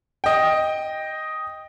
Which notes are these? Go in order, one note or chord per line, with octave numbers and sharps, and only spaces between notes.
D#5 G5